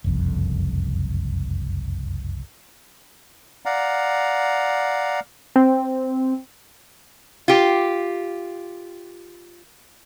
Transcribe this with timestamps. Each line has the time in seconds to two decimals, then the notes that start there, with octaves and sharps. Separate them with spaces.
0.04 F#1 C2 F2
3.65 D5 F5 F#5 A#5
5.56 C4
7.48 F4 G4